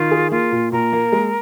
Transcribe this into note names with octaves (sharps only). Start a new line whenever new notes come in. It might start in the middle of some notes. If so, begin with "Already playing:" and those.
Already playing: D#3 F4
G#4
A#3 F4
A#2
A#2 A#4
A#3
G#3